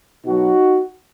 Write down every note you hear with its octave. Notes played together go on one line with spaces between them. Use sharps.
B2 F#3 D#4 F#4